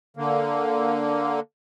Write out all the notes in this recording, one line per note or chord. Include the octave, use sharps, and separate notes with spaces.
D3 A#3